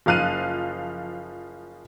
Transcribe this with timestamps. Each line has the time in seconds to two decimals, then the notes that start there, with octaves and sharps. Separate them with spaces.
0.06 F#1 F3 F5 F#6 D#7